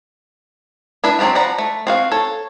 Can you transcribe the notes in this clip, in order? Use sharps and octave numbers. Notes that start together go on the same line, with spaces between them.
D4 E4 B4 E5
F#3 A#3 C4 D4 G4
F3 D5 F#5 A#5 B5
A3
C4 F#4 F5
A4 C#5